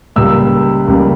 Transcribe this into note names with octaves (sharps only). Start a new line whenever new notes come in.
C#2 C#3 G3 A#3 E6
C#2 C#3 G3 A#3